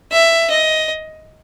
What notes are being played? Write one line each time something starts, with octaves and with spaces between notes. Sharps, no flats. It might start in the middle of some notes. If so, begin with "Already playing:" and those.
E5
D#5